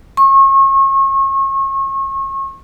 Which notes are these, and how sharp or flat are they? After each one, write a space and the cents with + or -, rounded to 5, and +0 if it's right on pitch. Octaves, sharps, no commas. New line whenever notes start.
C#6 -35